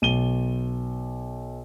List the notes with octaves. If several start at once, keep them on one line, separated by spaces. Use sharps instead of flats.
B1 D#7 G7